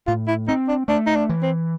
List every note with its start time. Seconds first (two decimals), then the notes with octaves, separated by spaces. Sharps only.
0.07 A2 F4
0.28 E4
0.48 C4 D#4
0.68 D4
0.88 A3 D4
1.07 D#4
1.16 D4
1.29 E3
1.43 C4